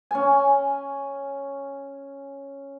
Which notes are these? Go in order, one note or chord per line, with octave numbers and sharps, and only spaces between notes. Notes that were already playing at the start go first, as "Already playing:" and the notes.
C#4 G#5